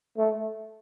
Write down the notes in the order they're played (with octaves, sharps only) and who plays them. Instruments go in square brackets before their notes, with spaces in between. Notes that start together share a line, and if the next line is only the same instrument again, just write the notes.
[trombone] A3